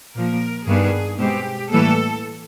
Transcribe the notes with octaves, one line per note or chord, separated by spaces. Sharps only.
A#2 F3 A#3 A#4
G2 D#3 G3 B3 D4 G#4
B2 G#3 C4 G4
A2 E3 G3 A#3 A4